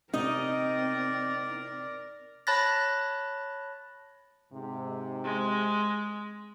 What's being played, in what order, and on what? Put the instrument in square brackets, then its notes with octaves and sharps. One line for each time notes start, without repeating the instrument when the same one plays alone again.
[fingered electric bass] C3 [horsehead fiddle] C4 [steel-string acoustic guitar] D#4 D#5 [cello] A#4 D5
[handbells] C#5 A5 B5 F#6 A6 A#6
[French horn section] G#2 C3
[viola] G#3